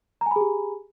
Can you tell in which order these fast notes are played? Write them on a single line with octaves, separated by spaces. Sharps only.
A#5 G#5 B5 G#4 G4